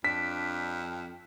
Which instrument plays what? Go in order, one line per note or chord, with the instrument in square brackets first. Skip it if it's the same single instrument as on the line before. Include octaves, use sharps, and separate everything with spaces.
[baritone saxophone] F2 [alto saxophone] D4 [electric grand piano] B6